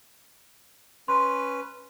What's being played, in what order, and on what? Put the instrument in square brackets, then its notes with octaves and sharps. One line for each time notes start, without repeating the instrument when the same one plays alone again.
[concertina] C#4 B4 [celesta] C6